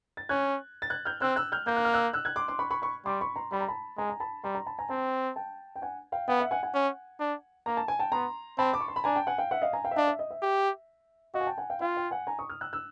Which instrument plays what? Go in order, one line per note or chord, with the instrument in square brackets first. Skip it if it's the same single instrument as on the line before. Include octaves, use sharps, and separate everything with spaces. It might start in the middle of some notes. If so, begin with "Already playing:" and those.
[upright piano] A6
[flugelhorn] C#4 [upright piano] F#6 G#6
[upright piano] A6
F#6 G#6
F6 G6
[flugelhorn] C4 [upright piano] E6 F#6
[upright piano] E6 F#6
F6 G6
[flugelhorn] A#3 [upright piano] G6
[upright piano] F#6
F6
E6 F#6
E6 F#6
F#6 G#6
C6 D6
C6 D6
B5 C#6
B5 C#6
B5 C#6
[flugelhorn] G3 [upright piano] C6 D6
[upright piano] B5 C#6
A#5 C6
[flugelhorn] G3 [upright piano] B5
[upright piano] A#5
A5 B5
[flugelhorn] G#3 [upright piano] G#5 A#5
[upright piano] A#5
A5 B5
[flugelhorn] G3 [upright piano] A#5 C6
[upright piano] A#5 C6
A5 B5
G#5 A#5
[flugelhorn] C4 [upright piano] G5 A5
[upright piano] G5 A5
G5
F#5 G#5
F5 G5
[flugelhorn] B3 [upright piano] F5 G5
[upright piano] E5 F#5
F#5 G#5
F#5 G#5
[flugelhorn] C#4
D4
[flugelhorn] A#3 [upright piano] A#5
[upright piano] A5
G#5
G5 A5
[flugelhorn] B3 [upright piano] A#5 C6
[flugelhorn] C4 [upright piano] A5 B5
[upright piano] D6
C#6
C6
B5
[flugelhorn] D4 [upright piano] G#5 A#5
[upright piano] G5 A5
F#5 G#5
F5 G5
E5 F#5
D#5 F5
G#5 A#5
F5 G5
E5
[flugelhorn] D4 [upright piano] D#5 F5
[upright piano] E5
D#5
E5
[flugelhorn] G4
[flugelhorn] F#4 [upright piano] D#5 F5
[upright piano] G#5
G5 A5
F#5 G#5
F5 G5
[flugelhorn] F4 [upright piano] F5 G5
[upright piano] F5 G5
F#5 G#5
G#5 A#5
C#6 D#6
D#6 F6
E6 F#6
E6 F#6